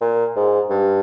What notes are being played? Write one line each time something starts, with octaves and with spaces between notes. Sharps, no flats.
A#2
G#2
G2